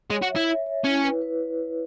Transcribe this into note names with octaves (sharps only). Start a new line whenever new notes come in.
G#3 C#5
F#4
E5
E4
E5
C#5
C#4 E4
B4
B4